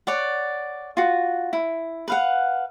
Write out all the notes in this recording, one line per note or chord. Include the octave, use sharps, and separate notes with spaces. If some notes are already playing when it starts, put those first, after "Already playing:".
C#5 D5 F#5
F4 F#4
E4
B4 F5 F#5